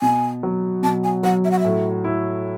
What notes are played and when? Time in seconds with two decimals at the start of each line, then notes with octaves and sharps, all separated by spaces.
0.01 B2 G#5
0.43 F#3
0.83 B2 A5
1.04 G#5
1.23 F#3 F#5
1.45 E5
1.51 F#5
1.60 A2 E5
2.04 E4